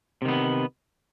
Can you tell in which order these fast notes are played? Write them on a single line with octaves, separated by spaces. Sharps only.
C3 D#3 B3